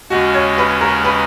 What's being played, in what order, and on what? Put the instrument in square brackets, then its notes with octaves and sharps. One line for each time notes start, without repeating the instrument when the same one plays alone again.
[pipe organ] D#2 C#3 G#3 C#4 [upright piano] F#4
[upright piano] C#5
B4
A#4
B4